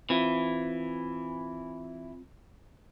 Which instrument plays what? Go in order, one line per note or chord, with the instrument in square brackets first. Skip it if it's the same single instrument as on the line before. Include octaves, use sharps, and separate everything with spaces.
[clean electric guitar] E3 [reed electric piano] C4 F4